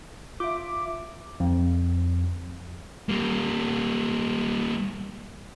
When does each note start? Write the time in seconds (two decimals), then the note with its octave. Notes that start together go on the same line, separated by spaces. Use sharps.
0.40 F4 E5 D6
1.40 F2
3.09 G3 A#3